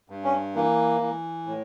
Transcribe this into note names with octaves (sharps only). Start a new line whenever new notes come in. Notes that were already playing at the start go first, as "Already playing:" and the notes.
G2
C#4
E3 A#3
E3
A2